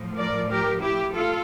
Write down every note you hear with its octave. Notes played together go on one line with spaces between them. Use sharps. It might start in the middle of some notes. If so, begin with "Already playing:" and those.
Already playing: A2 F3
A#4 D5
G4 A#4
E4 G4
F4 A4